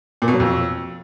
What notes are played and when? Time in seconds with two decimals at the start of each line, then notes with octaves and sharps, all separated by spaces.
0.22 A#2
0.28 B2
0.34 F#3
0.40 F2